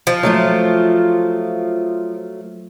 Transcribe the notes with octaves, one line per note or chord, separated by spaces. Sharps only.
F3
F#3 A3 F4